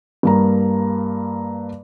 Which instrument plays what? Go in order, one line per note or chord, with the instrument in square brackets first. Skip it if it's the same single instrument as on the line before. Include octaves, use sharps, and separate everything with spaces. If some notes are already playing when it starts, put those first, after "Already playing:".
[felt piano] G2 A#3 A#5